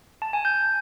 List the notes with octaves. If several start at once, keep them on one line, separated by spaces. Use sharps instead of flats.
A5
G#5
G6